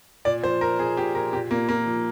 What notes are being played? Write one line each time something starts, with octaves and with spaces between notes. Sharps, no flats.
A#2 D5
F3 C5
F3 A#4
A#2 G#4
A#2 G4
A#2 A#4
A#2 G4
A#2 A#3
A#2 A#3
F3